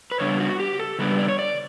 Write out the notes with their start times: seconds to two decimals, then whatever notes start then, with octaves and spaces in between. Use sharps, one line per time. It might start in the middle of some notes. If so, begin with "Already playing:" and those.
0.11 B4
0.20 C#3 G3 B3 D4 C#5
0.40 F#4
0.59 G4
0.79 A4
0.99 C#3 G3 B3 D4 B4
1.19 D5
1.28 C#5
1.39 D5